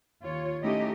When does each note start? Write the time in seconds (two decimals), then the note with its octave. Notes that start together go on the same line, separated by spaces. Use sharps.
0.23 D#2 F4 C#5
0.62 A3 C#4 D#4 E4 G4 D#5